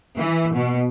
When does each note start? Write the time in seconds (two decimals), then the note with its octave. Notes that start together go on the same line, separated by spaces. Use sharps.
0.18 E3
0.54 B2